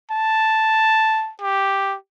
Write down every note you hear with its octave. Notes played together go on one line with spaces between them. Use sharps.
A5
G4